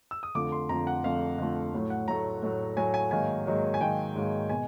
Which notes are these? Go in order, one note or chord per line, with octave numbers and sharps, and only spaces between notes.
E6
D#6
F2 D3 F3 A3 D6
C6
F2 D3 F3 A3 A#5
F#5
F2 D3 F3 A3 F5
F2 D3 F3 A3
A2 F#3 A3
F#5
A2 F#3 A3 A#5
A2 F#3 A3
A2 F#3 A3 G#5
G#5
G#2 D#3 F#3 A#3 G#5
G#2 D#3 F#3 A#3
G#5
G#2 D#3 F#3 A#3 G5
G#2 D#3 F#3 A#3
B2 G#3 G#5